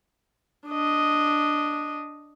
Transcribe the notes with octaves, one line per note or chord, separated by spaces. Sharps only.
D4 D#5